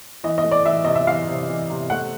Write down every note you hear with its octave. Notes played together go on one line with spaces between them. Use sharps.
E3 D#5
D#5
A3
D5
E3 E5
C3 D#5
E5
E3 F5
C3
E3
C3
A3 F#5